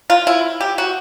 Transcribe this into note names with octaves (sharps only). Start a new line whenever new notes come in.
F4
E4
G4
F#4